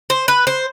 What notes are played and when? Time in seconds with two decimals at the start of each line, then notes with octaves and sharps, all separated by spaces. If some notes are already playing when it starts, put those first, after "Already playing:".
0.10 C5
0.28 B4
0.47 C5